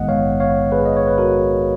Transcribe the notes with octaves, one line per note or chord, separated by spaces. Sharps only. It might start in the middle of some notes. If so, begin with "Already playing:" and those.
Already playing: A#1 G#2 D#3 G#3 B3 D#5 F#5
C#5 F5
C#5 F5
G#4 B4
D#5
C#5
B4
F#4 A#4